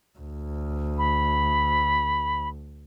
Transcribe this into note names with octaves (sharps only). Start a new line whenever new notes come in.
D2
B5